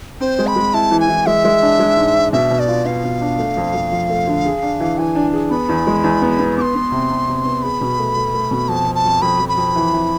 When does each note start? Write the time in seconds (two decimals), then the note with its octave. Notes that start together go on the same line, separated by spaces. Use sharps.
0.20 C4 C5
0.39 G#3
0.47 B5
0.56 G#3
0.73 E4 A5
0.91 E3
1.00 G#5
1.09 E3
1.26 G#3 E5
1.44 G#3
1.62 D4
1.79 G#3
1.97 G#2
2.15 D4
2.33 B2 E5
2.51 B2
2.59 D5
2.68 F4
2.85 B3 F5
3.04 B2
3.21 D4
3.38 A3
3.57 F2
3.74 F2
3.92 F3
4.09 A3
4.27 D3
4.45 G#4
4.62 D4
4.80 E3
4.98 E3 G#5
5.15 D4
5.33 G#4
5.51 B3 B5
5.69 E2
5.87 G#3
6.04 E2
6.22 B3
6.39 B3
6.57 B3 C6 D6
6.75 B3
6.92 C3
7.10 C3
7.28 C3
7.45 B3
7.63 G#4 B5
7.81 B2
7.99 A3
8.17 A3
8.34 A3
8.51 B2
8.69 F2 A5
8.86 F2
8.95 A5
9.05 F2
9.22 F2 B5
9.39 F2
9.49 B5
9.57 F2
9.75 E3
9.93 E3